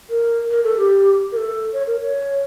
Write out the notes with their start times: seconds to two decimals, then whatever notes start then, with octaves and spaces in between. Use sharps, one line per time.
0.10 A#4
0.50 A#4
0.64 A4
0.78 G4
1.32 A#4
1.37 A4
1.73 C#5
1.87 A#4
2.01 C#5